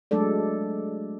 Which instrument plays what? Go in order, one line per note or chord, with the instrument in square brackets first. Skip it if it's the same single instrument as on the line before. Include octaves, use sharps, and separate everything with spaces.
[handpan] F#3 G#3 A3 D4 A4 D5